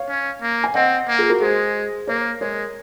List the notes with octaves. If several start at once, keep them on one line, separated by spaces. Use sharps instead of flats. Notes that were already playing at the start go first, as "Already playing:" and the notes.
Already playing: C#5 F5
C#4
A#3
G#5
C4 D#5 F#5
A#3
F4 G#4
F#4 A#4
G#3 G#4 C5
A#3 A#4 C#5
G#3 A#4 C#5